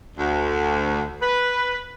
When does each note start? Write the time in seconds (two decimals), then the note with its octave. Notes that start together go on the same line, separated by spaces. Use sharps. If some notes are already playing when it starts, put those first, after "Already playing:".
0.16 D2
1.20 B4